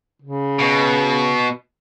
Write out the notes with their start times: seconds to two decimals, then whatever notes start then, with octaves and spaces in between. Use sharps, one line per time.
0.22 C#3
0.59 B2